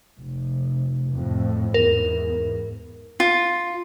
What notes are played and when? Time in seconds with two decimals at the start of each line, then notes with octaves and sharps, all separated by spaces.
0.19 F1
1.13 F2 A2
1.74 E2 G#2 A#4
3.20 F4